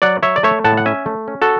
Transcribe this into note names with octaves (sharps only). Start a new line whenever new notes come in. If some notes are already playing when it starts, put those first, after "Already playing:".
F#3 D5 F#5
F#3 C#5 E5
D5
A3 C#5 E5
A2 F#5 A5
F#5
C#4 E5 G#5
A3
C#4
F#4 A4